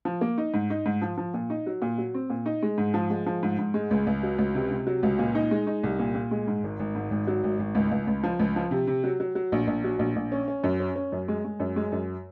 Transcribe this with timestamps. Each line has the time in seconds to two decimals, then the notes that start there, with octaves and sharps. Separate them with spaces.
0.05 F3
0.21 A#3
0.38 D#4
0.54 G#2
0.70 D#4
0.86 G#2
1.02 F3
1.18 F3
1.34 A#2
1.50 D#4
1.67 F#3
1.82 A#2
1.98 F#3
2.14 C4
2.30 A#2
2.46 D#4
2.62 G#3
2.78 G#2
2.94 F3
3.10 G#3
3.26 F3
3.43 G#2
3.59 G#2
3.74 G#3
3.91 C#2
4.07 C#2
4.23 F#3
4.38 C#2
4.55 C3
4.71 C3
4.87 F#3
5.03 C#2
5.19 A#2
5.35 D#4
5.51 G#3
5.67 D#4
5.83 C2
5.99 A#2
6.15 A#2
6.31 G#3
6.48 G#2
6.64 G#1
6.79 G#1
6.95 G#2
7.11 G#1
7.27 F#3
7.44 G#1
7.59 G#1
7.75 C#2
7.91 C#2
8.07 C#2
8.23 F3
8.39 C#2
8.56 F3
8.71 C3
8.87 C3
9.04 F#3
9.20 F#3
9.35 F#3
9.52 A#1
9.67 A#1
9.84 F#3
9.99 A#1
10.16 A#1
10.32 C#4
10.48 C#4
10.64 F#2
10.80 C#4
10.96 C#4
11.12 F#2
11.28 G#3
11.45 G#3
11.60 F#2
11.76 G#3
11.92 F#2